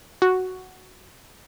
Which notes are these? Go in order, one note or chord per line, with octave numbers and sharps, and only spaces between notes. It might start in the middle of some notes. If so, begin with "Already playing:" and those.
F#4